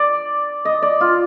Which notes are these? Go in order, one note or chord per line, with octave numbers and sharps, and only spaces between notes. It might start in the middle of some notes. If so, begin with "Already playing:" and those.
Already playing: D5
D#5
D5
F4